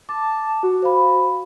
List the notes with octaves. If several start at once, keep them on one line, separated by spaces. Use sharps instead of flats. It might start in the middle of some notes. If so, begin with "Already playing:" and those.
A5 D6
F#4
C5 F5 B5